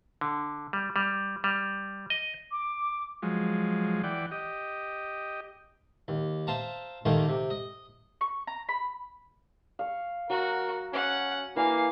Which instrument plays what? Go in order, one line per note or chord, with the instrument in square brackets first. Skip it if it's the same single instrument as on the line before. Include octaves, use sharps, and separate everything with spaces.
[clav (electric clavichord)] D3
G3
G3
G3
D#5
[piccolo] D6
[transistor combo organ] F3 F#3 G#3
E3 D5 F#5 G5
G4 D#5
[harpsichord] D#2
C5 E5 F5 A5 A#5
D#2 D#3 A3 A#3 G#5 C6
C3
D#5
[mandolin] C#6
A#5
B5
[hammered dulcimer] F5 C#6
[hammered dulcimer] F#3 [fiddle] F#4 [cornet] A#4
[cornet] C#4 [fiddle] F#5
[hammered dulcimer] E3 E5 G#5 [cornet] A#3 [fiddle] F5